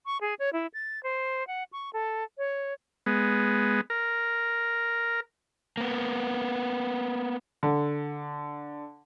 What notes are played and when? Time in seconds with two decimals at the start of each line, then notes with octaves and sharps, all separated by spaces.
0.06 C#6
0.21 G#4
0.39 C#5
0.53 E4
0.74 A6
1.03 C5
1.47 F#5
1.72 C#6
1.93 A4
2.38 C#5
3.06 G#3 B3
3.90 A#4
5.77 A#3 B3
7.63 D3